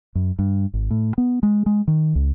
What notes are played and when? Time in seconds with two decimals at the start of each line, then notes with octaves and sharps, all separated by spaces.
0.15 F#2
0.39 G2
0.74 G#1
0.91 A2
1.18 B3
1.43 G#3
1.66 G#3
1.88 D#3
2.15 C#2